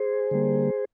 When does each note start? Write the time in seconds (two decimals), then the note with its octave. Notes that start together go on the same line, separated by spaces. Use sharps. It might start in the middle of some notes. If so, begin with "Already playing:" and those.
Already playing: G#4 C5
0.31 D3 G3 A#3